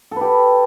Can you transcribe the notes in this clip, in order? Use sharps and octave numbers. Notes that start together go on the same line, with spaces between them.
G4 A4 B4